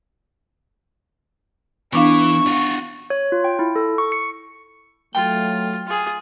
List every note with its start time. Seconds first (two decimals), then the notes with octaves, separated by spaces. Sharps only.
1.93 E3 B3 D4 F5 C#6
2.47 F4 F#4
3.10 C#5
3.32 F4
3.44 G5
3.59 E4
3.76 A4
3.98 C#6
4.12 C#7
5.15 F#3 A3 F4 G5
5.86 F4 G#4